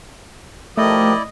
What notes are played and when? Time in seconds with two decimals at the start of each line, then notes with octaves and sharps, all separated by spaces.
0.77 F3 A3 E4 G4 A#4 D5 D#5